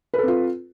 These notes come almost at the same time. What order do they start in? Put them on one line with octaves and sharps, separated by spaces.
B4 A4 C4 F4